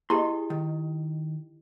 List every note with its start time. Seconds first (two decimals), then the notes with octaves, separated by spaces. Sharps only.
0.10 E4 G4 G#4 D#5 C6
0.50 D#3